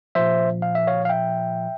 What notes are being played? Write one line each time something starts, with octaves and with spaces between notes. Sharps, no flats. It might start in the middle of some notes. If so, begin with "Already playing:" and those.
A#2 F3 C5 E5
F5
E5
C#5 F5
F5
E5 G5